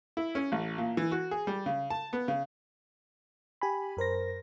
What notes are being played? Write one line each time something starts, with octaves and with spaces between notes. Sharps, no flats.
E4
C#4
A1
A#2
E3
F#4
G#4
G3
C#3
A5
B3
C#3
G4 G#5 B5
F#2 A#4 C5 A#6